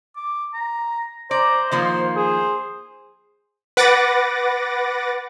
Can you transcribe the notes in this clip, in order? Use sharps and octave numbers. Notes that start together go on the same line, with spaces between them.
D6
A#5
C5 D5 A#5
D#3 F3 A#3 C6
G#4 C5
B4 F#5 D6 A6 A#6